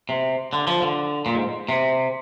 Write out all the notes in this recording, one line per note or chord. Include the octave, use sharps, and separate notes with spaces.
C3
D3
F3
D3
A#2
G#2
C3